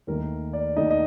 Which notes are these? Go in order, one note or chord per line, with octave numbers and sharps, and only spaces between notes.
D#2 D#3 A3 D#4 A#4
D5
D#2 D#3 A3 D#4 D#5
D#5